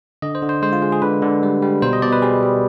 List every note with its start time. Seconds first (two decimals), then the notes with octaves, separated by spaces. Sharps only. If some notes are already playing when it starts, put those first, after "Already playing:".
0.22 D3 D#5
0.35 C5
0.42 D3
0.49 C5
0.62 G#3 C5
0.73 F4
0.82 G#3
0.92 G#4
1.02 D3 B4
1.22 D3
1.43 G3
1.62 G3
1.82 B2 C5
1.93 D#5
2.02 B2 D5
2.13 B4
2.22 G3 G#4
2.43 G3